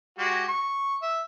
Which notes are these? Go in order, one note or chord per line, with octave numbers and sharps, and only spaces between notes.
G#3 F#4 G4
C#6
E5